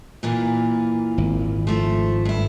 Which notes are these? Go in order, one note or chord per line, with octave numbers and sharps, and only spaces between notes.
A#2 E3 A#3
G#1
F3 A3
G2 E4